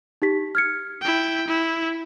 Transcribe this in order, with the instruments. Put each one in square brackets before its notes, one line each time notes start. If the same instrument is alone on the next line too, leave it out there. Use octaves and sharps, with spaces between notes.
[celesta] D#4 G4 B6
F6 G#6 C#7
[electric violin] E4 G5
E4